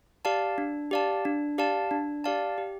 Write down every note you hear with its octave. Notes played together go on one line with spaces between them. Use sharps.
G4 D5 F5 A5
D4
G4 D5 F5 A5
D4
G4 D5 F5 A5
D4
G4 D5 F5 A5
G4